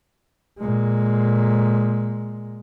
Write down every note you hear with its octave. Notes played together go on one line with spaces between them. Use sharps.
A#2 G#3